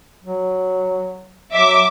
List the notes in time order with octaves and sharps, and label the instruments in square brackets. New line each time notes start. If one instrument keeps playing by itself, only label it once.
[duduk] F#3
[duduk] F#3 [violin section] E5 D6